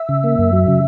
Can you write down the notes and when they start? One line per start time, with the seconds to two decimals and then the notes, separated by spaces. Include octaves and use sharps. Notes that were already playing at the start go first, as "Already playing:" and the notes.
Already playing: E5
0.09 C#3
0.24 A#3
0.39 F#2
0.53 F#3
0.68 C#3